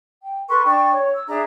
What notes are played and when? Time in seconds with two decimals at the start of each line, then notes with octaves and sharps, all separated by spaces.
0.24 G5
0.48 A4 B4 C6 C#6
0.65 D4 G5 C#6
0.92 C#5
1.13 E6
1.28 D4 G#4 E5 A#5